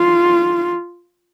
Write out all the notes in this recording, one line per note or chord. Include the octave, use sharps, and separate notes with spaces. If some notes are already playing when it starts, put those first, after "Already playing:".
Already playing: F4